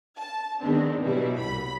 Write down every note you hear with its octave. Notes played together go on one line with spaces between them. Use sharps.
A5
D#3 G#3 B3 C4 D4
B2 E3 F#3 G3 E4
C2 B5